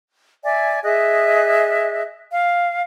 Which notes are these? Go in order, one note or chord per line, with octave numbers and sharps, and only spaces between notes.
D5 E5 G#5
G#4 D#5 E5 F#6
F5